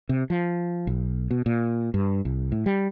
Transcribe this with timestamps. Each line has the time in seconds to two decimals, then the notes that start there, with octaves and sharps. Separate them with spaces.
0.09 C3
0.30 F3
0.87 B1
1.31 B2
1.46 A#2
1.94 G2
2.25 C2
2.52 A2
2.66 G3